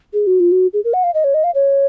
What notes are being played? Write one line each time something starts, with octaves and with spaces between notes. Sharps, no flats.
G#4
F#4
F4
F#4
G#4
A#4
F#5
F5
D#5
C#5
D#5
F5
C#5